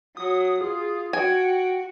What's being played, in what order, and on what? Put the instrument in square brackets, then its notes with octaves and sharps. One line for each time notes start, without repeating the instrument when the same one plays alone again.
[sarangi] F#3 [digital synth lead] D#6
[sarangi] F4 [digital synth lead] G#4
[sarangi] F#4 [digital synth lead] G5 [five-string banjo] G#5